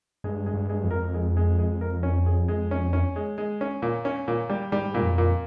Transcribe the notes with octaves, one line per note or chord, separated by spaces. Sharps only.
G2 G#3
G#3
G2
G#3
F2
A#4
G#3
G#3
G#3
A#4
C#4
G#4
G#3
C#4
C#4
G#3
G#3
C#4
A#2
C#4
A#2
G3
G#2 G3
A#2
F2
A#2